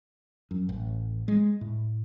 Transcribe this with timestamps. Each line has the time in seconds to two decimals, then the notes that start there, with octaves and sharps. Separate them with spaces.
0.51 F#2
0.69 A1
1.28 G#3
1.61 A2